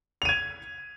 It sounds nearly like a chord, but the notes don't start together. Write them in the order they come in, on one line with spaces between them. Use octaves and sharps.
F7 D#7 G#6